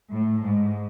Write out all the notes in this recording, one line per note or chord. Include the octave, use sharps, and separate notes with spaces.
A2
G#2